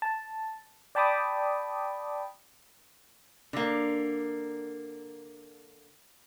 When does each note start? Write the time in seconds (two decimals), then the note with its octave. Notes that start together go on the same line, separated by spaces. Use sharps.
0.02 A5
0.95 D5 G5 A5 B5 D6 D#6
3.53 D3 A#3